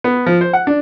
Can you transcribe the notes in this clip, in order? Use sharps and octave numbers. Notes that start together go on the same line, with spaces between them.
B3
F3
C5
F#5
D4